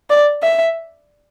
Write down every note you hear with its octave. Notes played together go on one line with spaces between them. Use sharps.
D5
E5